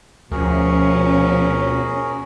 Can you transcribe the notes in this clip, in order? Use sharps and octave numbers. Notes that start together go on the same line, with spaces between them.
D2 B2 F3 C#4 F#4 G#4 A#4